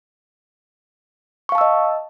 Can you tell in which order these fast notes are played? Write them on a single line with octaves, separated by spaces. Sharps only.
C#6 F5 A5 E6 D#5